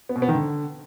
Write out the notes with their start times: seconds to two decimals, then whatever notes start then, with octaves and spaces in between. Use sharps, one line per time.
0.09 B3
0.16 B2
0.22 B3
0.28 D#3
0.35 D3